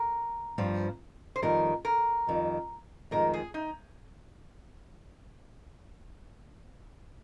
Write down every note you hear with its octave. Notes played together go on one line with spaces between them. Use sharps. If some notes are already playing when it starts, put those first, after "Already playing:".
Already playing: A#4
G2 F3 C4
C5
F2 D#3 G3 A#4
A#4
F2 D#3 G3
F2 D#3 G#3 A#4
G#4
D#4